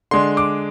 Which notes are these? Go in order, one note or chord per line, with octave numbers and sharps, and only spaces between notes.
D3 G#3 D4 C6
D6